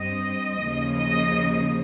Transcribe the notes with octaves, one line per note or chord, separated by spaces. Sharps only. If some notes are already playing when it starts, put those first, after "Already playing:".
Already playing: G2 G3 C4 D#5
D#2 C#3 F3 A#3
D#5